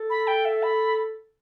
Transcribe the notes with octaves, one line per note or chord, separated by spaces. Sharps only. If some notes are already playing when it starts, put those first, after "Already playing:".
Already playing: A4
B5
G5
E5
B5